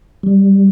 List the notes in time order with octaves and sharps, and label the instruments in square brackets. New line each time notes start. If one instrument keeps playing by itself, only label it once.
[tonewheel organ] G3